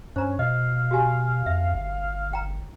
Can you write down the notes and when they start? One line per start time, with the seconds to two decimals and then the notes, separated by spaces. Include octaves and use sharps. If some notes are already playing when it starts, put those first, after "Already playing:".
0.16 G2 C#4 C5 A#5
0.39 B2 D#5 F5
0.91 F#4 G4 G#5
1.46 F2 E5
1.74 G1
2.33 G5 A#5